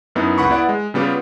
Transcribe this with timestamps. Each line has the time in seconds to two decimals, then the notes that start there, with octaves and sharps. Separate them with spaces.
0.15 F#2 B3 D#4 E4
0.38 C#2 F#5 B5 C#6
0.50 B3 E4 D5 F#5
0.69 G#3
0.94 C#3 G3 B3 F4 G4